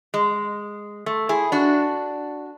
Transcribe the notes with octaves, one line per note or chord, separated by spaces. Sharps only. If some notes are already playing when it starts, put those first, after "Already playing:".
G#3
A3
E4 G#4
D4 F#4